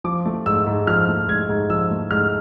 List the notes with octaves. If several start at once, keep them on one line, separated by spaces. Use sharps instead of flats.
F3 D6
A3
G#2 E6
G#2
F3 F6
A3
G#2 G#6
G#2
F3 E6
A3
G#2 F6